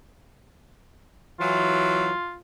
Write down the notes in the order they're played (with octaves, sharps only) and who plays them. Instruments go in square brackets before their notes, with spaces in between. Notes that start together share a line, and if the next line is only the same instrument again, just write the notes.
[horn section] E3 F#3 [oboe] F4